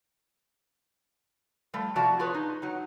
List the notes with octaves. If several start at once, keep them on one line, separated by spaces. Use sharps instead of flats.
F3 G3 A3
A2 C3 F3 F#4 D5 A5
F4 G#4 B4 C#5
D#4
F#3 D#4